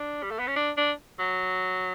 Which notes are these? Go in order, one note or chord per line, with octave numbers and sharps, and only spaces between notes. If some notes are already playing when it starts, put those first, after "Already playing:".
Already playing: D4
G3
A3
B3
C#4
D4
D4
F#3